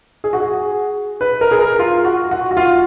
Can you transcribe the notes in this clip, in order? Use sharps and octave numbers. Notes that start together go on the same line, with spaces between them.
G#4
F#4
G#4
B4
A#4
G#4
A#4
F4
F#4
F#4
F#4
F4